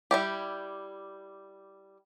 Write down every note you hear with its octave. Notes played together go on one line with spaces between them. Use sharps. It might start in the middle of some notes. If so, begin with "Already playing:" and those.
G3 E4 G4